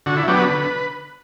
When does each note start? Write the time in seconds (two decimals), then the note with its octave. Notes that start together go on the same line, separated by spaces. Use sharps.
0.06 D3 F#4
0.17 E4
0.27 F#3 B3 D4 G4
0.38 B4
0.49 D3